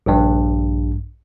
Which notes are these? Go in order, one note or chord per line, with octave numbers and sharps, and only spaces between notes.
A#1 G2